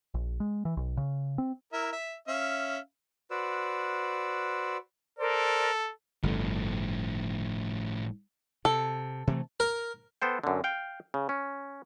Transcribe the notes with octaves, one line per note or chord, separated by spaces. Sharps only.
A#1
G#3
E3
B1
C#3
C4
E4 A#4 E5
E5
C#4 E5 F5
F#4 B4 C5 D5 E6
A4 A#4 C5 D5
G1 A2 D3 F3
C3 A4
C3 E3 A3
A#4
B3 A4 C5 G5
F#2 D3
F5 G5
C#3
C#4